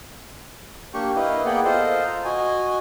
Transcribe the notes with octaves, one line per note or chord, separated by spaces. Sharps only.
A#3 D4 G4 C#6
E4 B4 D#5 F5
A#3 B3 G#4 D5 F#5 G5
F4 A4 C5 D#5
A#5
F#4 D#5 G#5